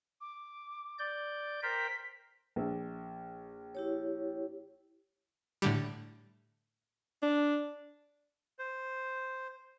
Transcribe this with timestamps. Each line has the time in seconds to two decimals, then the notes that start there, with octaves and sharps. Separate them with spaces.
0.21 D6
0.99 D5 G6
1.63 A#4 C5 G5 B6
2.56 A#1
3.75 E4 G4 C#5
5.62 A2 D3 G3
7.23 D4
8.59 C5